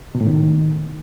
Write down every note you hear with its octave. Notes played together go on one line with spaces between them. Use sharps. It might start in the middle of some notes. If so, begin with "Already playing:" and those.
B2
A2
D#3